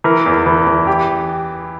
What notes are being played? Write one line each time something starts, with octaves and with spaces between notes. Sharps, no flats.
E3 A#4
E2
E3
E3
G4